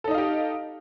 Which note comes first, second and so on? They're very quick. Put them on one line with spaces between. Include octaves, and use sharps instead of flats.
A4 D#4 D#5 F5 G4